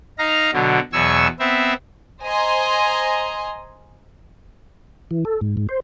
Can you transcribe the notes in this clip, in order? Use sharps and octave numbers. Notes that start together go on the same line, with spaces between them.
D#4 F5 A#5
B2 D3 F#3
E2 B2 F#3 G#5 C#6 E6
B3 C4 E5
C5 D#5 G#5 A#5 C6
E3
A4
G#2
G#2
C5